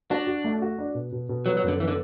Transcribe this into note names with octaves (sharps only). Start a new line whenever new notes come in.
D4 F#4
F#4
A3
F#4
D4
B2
B2
B2
F#3 B3
F#3
F#2 D3
E3 B3
D3